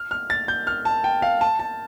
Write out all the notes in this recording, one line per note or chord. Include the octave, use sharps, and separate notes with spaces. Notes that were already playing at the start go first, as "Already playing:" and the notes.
Already playing: F6
F6
A6
G6
F6
A5
G5
F5
A5
A5